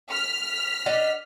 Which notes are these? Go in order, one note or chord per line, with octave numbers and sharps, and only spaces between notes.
F6 B6
D4 D#5 F#5